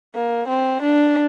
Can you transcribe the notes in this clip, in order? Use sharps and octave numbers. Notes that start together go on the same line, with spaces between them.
A#3
C4
D4